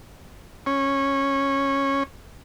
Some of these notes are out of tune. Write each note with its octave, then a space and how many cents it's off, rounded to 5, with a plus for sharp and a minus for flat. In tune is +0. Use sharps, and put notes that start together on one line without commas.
C#4 -15